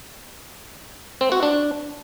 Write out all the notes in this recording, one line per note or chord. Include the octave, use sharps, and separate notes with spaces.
C4
F#4
D4